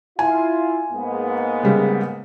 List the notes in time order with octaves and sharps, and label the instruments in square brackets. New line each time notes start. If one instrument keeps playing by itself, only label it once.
[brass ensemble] E4 F4 [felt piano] G#5
[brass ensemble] G#2 A#3 B3
[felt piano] C#3 G3 G#3